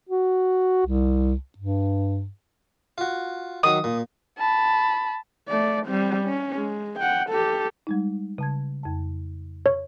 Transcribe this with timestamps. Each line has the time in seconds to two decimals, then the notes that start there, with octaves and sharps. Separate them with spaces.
0.09 F#4
0.86 C2
1.58 G2
2.98 F4 F#4
3.63 D#3 F#3 D#6
3.84 A#2
4.38 A5 B5
5.48 A3 D5
5.86 G3 C4
6.24 C#4
6.55 G#3
6.99 F#5 G5
7.30 G4 A4
7.87 G3 G#3 D#4
8.38 C#3 A5 G#6
8.83 F2 A5
9.66 C#5